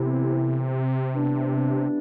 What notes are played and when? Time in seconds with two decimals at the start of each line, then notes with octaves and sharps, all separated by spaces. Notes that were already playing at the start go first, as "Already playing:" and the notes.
Already playing: A2 C3 E3 B3 E4
1.15 E3 G3 B3 D4